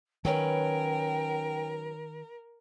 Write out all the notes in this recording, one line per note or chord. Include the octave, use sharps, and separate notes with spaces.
D#3 F#3 C#4 A#4 B4 G5